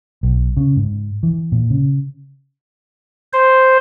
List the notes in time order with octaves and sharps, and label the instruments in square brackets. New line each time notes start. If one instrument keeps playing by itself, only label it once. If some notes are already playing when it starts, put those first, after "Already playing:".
[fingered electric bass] B1
C#3
G#2
E3
A#2
C#3
[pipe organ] C5